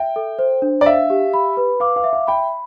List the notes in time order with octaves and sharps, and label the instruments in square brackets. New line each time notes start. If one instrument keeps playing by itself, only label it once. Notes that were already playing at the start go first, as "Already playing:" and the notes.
Already playing: [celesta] E5 [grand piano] G5
[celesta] A4
C5
D4
[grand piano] D5
[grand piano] E5 [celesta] F5
[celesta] G4
B5
B4
[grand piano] F5 [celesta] D6
[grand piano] F5
[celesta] E5
[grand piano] F5
[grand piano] G5 [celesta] B5